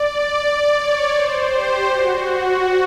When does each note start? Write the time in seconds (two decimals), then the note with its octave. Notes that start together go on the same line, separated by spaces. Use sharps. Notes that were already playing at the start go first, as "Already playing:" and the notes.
Already playing: D5
0.74 C#5
1.12 C5
1.49 G4
1.86 F#4